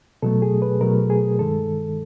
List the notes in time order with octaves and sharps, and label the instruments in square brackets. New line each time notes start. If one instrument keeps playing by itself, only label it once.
[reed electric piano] B2 F#3 A3 A4
G#4
B4
B2 F#3 A3 A#4
G#4
G2 D#3 G#3 A4